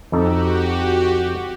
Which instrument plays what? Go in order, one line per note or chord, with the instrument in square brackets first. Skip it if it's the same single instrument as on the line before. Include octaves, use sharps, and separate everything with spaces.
[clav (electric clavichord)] F2 D#4 A4 [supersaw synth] F#4 G4